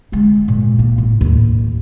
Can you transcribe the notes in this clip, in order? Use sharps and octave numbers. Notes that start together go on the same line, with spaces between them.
D3 G#3
A#2
A#3
A2
D#2 A2